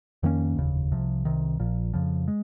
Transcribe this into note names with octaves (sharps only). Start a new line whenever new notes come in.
F2 D#3 A#3 C#4
F1 D#2 C#3
C2 C3 F3
C2 C3 D#3
A#1 A#2 F3
F2 C#3 F3
G#3